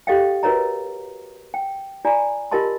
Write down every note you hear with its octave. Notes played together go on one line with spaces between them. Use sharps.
G4 A4 D#5 F5 G5
F#4 A#4 B4 C#5 D#5 A#5
G5
F4 D5 G#5 A#5
F4 G4 A#4 D#5 A5 C6